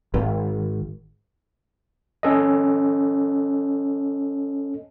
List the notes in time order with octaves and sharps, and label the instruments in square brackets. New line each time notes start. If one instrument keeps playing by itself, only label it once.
[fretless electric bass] G#1
[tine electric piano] C#4 A4 D#5